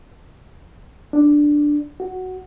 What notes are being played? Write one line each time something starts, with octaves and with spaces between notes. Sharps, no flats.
D4
F#4